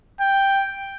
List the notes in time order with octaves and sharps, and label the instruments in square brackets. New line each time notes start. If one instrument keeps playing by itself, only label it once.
[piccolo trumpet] G5